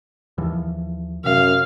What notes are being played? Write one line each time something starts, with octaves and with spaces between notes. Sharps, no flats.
D#2 E3 F3
F#2 C3 F5